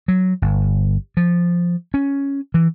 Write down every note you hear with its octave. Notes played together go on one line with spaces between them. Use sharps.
F#3
G1
F3
C#4
E3